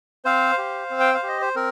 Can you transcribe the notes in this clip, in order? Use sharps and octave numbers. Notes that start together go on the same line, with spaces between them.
C4 C5 F5
G4
C4
G5
F5
G4 D#5
C5
C4 A#4